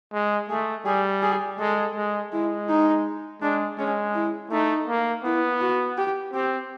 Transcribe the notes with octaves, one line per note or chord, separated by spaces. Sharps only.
G#3
A3 G#4
G3 G#4
G#4
G#3 A4
G#3
G#3 E4
D#4
G#3 D4
G#3 C#4
E4
A3 D#4
A#3
B3 E4
F#4
G4
C4 G4